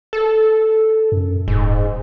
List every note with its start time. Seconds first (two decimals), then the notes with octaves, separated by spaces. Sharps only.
0.13 A4
1.12 F#2
1.48 D#1 G#2